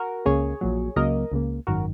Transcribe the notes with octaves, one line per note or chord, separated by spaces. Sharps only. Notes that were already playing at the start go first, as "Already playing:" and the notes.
Already playing: F#4 A#4
C#2 C#3 A#3 G#4 C#5
A#1 A#2 F#3
C#2 C#3 F#3 A#3 A#4 D#5
C#2 C#3 A#3
G#1 F#2 D#3 F#4 A#4